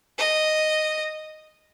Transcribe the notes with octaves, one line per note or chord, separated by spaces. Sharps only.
D#5